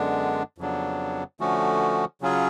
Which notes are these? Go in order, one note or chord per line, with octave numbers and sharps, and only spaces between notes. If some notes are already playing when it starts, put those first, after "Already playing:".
Already playing: F#2 D3 G#3 B3 D4
F2 C#3 F#3 B3 D4
D3 F3 A3 C#4 F#4
C#3 F#3 C#4 F4 G#4